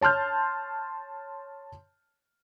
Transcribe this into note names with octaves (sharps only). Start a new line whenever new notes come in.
C#5 A5 C6 F6 G6